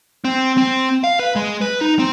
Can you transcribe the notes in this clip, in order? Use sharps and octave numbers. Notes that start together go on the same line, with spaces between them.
C4
C4
F5
B4
G#3
B4
D#4
C4